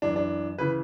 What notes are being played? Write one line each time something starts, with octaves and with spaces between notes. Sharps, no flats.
F#2 E3 D4
D4
C#3 E3 B4